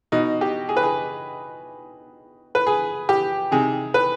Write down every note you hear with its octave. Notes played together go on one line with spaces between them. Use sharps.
B2 D#4
G4
G#4
B4
G#4
B4
G#4
G4
C3 D#3 G#4
B4